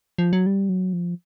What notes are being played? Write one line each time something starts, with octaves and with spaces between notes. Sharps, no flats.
F3
F#3
G3
F#3
F3